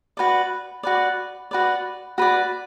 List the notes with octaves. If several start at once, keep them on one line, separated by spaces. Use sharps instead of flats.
F#4 B4 D5
F#4 B4 D5
F#4 B4 D5
F#4 B4 D5